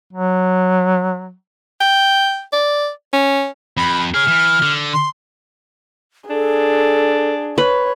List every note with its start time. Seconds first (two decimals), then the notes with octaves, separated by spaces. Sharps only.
0.13 F#3
1.81 G5
2.53 D5
3.13 C#4
3.77 F2 B5
4.14 G#4 C#5 F6
4.28 E3
4.62 D3
4.93 C6
6.30 D4 G#4 A4
7.58 B4 C#5